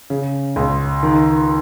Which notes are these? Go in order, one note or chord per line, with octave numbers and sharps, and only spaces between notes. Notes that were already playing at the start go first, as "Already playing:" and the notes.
C#3
C#2
D#3